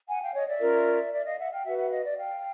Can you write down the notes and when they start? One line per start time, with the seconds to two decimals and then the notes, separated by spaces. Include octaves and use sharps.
0.08 F#5 G#5
0.21 F5 G5
0.34 C#5 D#5
0.47 D5 E5
0.60 C#4 F4 A#4
1.12 D5 E5
1.25 D#5 F5
1.38 E5 F#5
1.51 F5 G5
1.64 F#4 B4 E5 F#5
1.77 E5 F#5
1.90 D#5 F5
2.03 D5 E5
2.16 F5 G5